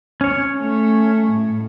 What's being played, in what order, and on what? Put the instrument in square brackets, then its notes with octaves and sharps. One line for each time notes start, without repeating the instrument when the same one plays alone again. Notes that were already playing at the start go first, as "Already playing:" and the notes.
[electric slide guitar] C#4 C#5
[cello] A3
A2